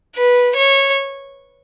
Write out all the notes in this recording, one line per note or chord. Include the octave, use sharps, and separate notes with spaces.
B4
C#5